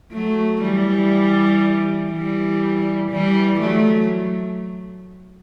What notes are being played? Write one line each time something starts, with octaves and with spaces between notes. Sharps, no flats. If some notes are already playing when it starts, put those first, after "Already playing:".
F#3 A3
E3 G3
E3 G3
E3 G3
F#3 A3